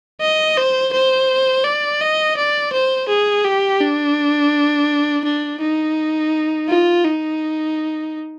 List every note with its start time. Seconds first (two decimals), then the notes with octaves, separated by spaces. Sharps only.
0.21 D#5
0.57 C5
0.93 C5
1.64 D5
2.01 D#5
2.37 D5
2.73 C5
3.08 G#4
3.44 G4
3.81 D4
5.24 D4
5.61 D#4
6.69 F4
7.05 D#4